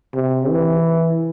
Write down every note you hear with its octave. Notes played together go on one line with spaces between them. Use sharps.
C3
E3